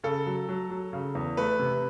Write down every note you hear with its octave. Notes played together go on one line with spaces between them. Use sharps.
C#3 A4
F#3
F#3
F#3
C#3
E2
A3 B4
C3